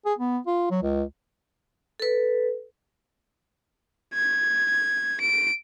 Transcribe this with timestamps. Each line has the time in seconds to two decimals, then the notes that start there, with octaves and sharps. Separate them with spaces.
0.05 G#4
0.18 B3
0.47 F4
0.71 F#3
0.82 C#2
2.00 A4 B4
4.14 G#6
5.21 D7